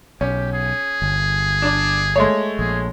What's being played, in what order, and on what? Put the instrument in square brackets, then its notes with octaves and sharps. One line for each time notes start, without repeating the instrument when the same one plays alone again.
[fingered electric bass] B1 [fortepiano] C#4 [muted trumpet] G4
[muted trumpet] G#4
[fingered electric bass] G1
[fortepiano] D4 D5
G#3 A3 C#5
[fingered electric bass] A#1 [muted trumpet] G#4